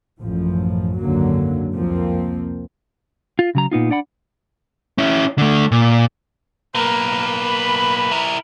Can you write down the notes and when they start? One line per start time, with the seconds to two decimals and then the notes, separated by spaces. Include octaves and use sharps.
0.20 A1 F#2 F3
1.00 G#1 C#2 F#2 D3 F#3 A#3
1.76 C2 F2 F3 A#3 C4
3.39 F4
3.55 C#3 F#3 A#5
3.72 A#2 B3 D#4 F4
3.90 D4 D5 F#5 B5
4.98 C#4 E4
5.38 D3 A3
5.72 A#2
6.75 B1 A#3 A#4 B4
7.48 B5
8.11 E4 A#4